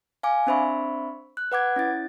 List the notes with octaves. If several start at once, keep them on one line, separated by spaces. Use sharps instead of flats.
F5 G#5 D6
C4 D4 C5 E5 B5 C#6
F#6
B4 F#5 D6 G#6
C#4 E4 A6